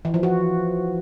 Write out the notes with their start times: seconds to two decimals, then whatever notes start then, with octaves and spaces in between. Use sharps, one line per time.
0.05 E3
0.14 F3
0.23 F#4